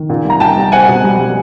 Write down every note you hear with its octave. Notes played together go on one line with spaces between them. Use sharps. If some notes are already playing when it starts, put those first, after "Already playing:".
Already playing: D#3
A#2
C2 A#5
A#2 G5 A5
C2
C4 F#5 G#5
B2
G3
G3